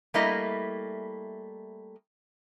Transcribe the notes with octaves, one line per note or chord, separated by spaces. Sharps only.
G3 A3 A#3 E4 D#5